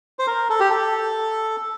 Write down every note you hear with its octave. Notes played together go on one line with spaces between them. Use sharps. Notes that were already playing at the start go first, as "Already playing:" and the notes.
C5
A#4
A4
G4
A4